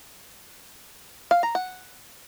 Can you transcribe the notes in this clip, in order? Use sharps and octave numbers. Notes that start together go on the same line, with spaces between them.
F5
A#5
F#5